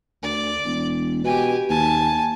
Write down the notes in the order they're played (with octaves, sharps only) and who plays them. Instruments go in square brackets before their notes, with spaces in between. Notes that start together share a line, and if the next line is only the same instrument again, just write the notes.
[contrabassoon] D2 [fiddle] D5
[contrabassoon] E1
[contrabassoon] B2 [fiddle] G4 G#5
[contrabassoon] D#2 [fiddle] G#5 A5